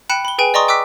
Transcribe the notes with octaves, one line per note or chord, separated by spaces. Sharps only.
G5 B5 F#6 C#7 E7
B5 G7
G#4 B4 G5 G#5 D7
D5 D#5 A#5 C6 C#6 D#6
G5 D6 E6 F#6 B6